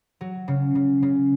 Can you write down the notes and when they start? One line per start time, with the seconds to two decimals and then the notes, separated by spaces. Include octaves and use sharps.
0.21 F#3
0.48 C#3
0.75 C#3
1.02 C#3